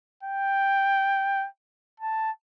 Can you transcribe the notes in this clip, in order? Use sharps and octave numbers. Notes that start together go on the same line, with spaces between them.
G5
A5